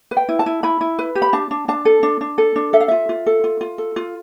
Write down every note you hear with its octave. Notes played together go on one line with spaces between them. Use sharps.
B4
G5
E4
A5
E4
E4 B5
E4
B4
G4
B5
D4 A5
D4
D4 A5
A4
D4
D4
A4
D4
A4 E5
F5
F4 E5
F4
A4
F4
F4
A4
F4